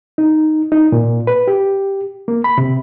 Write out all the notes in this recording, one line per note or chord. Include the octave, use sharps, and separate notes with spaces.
D#4
D#4
A#2
B4
G4
A#3
B5
C3